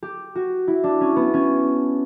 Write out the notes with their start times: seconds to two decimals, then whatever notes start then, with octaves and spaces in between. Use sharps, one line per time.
0.03 G4
0.35 F#4
0.68 E4
0.84 D4
1.01 C#4
1.16 B3
1.34 C#4